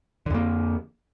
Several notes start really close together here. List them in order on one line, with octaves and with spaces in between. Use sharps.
D3 F2 A#3